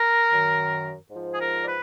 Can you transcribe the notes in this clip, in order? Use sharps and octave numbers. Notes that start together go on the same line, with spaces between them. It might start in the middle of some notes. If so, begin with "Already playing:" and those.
Already playing: A#4
F#2 D#3
G#2 F3
G#4
A#4
D5
B4